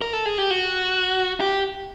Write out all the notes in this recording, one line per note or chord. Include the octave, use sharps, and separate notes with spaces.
A#4
A4
G#4
G4
F#4
G4